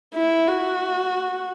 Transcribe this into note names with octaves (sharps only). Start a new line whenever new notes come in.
E4
F#4